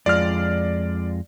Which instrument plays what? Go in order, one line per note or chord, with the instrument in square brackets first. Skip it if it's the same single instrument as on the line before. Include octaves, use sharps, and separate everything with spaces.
[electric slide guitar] F2 G#3 F4 [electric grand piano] D5 F6